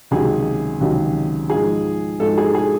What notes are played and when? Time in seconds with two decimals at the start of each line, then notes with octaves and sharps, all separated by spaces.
0.11 C#2 C3 D#3 F#3 G#4
0.81 C#2 C3 D#3 F#3
1.50 G#2 F3 G#4
2.20 G#2 F3 A4
2.38 G#4
2.55 G#4